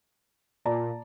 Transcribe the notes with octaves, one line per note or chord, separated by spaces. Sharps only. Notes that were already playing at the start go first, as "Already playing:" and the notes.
A#2 D5 A5 A#5